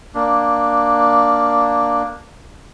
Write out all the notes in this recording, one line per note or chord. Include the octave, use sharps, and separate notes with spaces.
A#3 D4